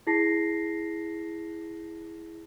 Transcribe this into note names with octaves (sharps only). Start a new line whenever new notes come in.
E4 G#4 A5 A#6 C7